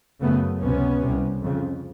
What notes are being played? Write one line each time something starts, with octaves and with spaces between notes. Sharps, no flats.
F#2 C#3 A3 B3
C#2 C3 B3 C#4
C2 C3
F2 C#3